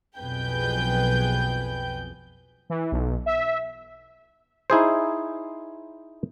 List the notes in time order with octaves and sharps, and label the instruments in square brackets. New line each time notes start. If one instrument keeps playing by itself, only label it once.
[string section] B1 F2 G#4 B4 G5 G6
[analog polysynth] E3
B1
E5
[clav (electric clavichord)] D#4 E4 G#4 C5